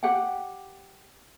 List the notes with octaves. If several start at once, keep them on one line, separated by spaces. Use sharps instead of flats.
G4 F#5 G5